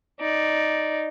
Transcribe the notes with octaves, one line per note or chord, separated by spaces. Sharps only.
D#4 D5